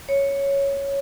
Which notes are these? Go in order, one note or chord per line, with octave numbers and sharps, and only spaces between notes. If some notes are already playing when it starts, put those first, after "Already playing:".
C#5